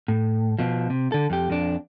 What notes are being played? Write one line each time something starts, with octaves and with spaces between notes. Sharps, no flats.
A2
B2 F3
C3
D3 A4
F2 G4
F2 D4